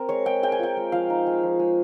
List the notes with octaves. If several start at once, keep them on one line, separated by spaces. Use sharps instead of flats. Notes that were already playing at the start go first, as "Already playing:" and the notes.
Already playing: C4 A#4
G#3 C#5
G#3 G5
G#3 G5
G#5
F4 G5
G#3
F3 F5
D#4
G#3
F3
G#3